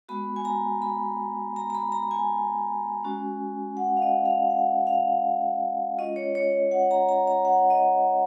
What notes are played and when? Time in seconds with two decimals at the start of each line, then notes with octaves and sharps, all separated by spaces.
0.09 G#3 B3 F#4 B5
0.36 G#5
0.45 A#5
0.82 B5
1.56 A#5
1.70 A#5
1.75 B5
1.92 A#5
2.11 G#5
3.03 G#3 C#4 F#4
3.77 F#5
3.97 F5
4.02 D#5
4.25 F5
4.50 F#5
4.87 F5
5.98 G#3 C#4 F4 D#5
6.16 C#5
6.35 C#5
6.71 F#5
6.91 A#5
7.09 A#5
7.27 A#5
7.45 F#5
7.70 D#5